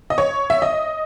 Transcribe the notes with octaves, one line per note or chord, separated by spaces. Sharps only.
D#5
C#5
E5
D#5